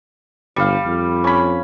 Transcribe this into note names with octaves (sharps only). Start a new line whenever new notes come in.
G1 G3 F5
F2
C#4 B5